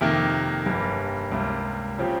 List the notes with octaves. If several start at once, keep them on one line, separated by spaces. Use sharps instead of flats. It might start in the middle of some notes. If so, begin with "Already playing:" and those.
F2 C3 D#3 A#3
G1 G2 G3 A#3
C#2 C3 G3 A#3
C#3 F3 C4 G4